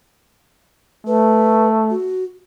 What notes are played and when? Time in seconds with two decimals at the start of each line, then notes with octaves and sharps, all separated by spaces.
1.07 A3 B4
1.90 F#4